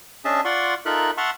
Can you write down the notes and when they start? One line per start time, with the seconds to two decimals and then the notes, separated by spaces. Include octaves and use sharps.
0.25 C#4 D4 G#4 D#5 E5 A5
0.45 F4 D5 F#5 C6 C#6
0.86 D#4 F4 A4 A#4 E5 F#6
1.17 E5 F#5 A5 C6 C#6 F6